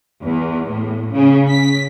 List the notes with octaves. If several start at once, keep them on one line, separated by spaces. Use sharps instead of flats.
E2
A2
C#3
B6